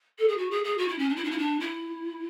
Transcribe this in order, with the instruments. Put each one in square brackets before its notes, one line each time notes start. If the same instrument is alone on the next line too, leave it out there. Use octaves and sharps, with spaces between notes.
[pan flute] A4
G#4
F#4
G#4
G#4
F#4
E4
C#4
D4
E4
D4
E4
D4
E4